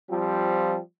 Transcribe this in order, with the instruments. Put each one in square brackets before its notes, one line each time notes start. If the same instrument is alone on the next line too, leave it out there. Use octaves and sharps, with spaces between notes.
[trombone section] F3 G3 C4 F4